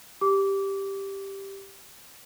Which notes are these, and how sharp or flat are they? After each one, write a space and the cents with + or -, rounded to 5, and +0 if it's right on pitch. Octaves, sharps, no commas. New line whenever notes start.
G4 +0 D6 -20